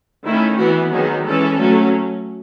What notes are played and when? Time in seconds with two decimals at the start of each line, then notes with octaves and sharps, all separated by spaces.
0.25 D#3 A3 C#4 E4
0.57 E3 B3 F#4
0.90 D#3 F#3 B3 G#4
1.25 E3 G#3 C#4 A4
1.57 F#3 A3 C#4